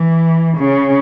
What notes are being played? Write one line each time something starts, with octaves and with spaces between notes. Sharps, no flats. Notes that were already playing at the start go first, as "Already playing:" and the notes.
Already playing: E3
C#3